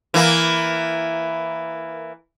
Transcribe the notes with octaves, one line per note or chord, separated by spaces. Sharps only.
E3 A#3